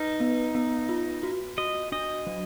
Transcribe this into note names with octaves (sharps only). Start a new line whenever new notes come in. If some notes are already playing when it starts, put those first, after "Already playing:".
Already playing: D#4 B4
B3
B3
F4
F#4
F#4 D#5
D4 D#5
F#3